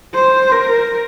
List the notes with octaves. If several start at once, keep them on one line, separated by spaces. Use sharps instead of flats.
C5
A#4